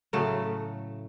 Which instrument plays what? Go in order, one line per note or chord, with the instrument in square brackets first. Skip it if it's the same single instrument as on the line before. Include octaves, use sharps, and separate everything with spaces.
[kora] A2 C#3 F#3 A3